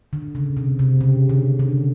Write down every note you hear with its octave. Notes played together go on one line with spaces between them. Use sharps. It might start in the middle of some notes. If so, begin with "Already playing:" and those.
D3
C#3
C3
C3
C#3
D3
D3